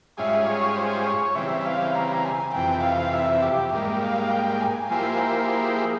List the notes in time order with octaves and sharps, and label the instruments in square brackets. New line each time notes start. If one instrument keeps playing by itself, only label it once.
[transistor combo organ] G#2 G3 C#4 F4 G#4 [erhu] E5
[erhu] C#5
C5
C#5
[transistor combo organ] C#3 E3 G3 C4 [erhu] E5
[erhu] F5
A#5
G#5
[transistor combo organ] F2 C3 E3 [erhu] G5
[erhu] F5
E5
G4
[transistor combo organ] G#2 G3 A#3 [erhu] G4
[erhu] F5
G5
G#5
[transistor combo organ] F3 A#3 E4 G4 C5 [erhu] G#5
[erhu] A#4
G#4